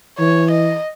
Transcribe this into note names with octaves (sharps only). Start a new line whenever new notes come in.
E3 C#5
D#5